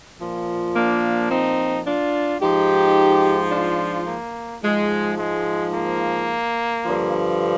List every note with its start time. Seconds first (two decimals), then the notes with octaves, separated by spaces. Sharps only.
0.20 A#2 F3
0.75 A#3 D4
1.30 C4 D#4
1.85 D4 F4
2.40 G#2 F3 D#4 G4
3.52 D4 F4
4.07 A#3
4.62 G#2 F3 G#3
5.18 G#3
5.73 A#3
6.84 G2 D3 F3